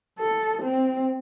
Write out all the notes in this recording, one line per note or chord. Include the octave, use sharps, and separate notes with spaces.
A4
C4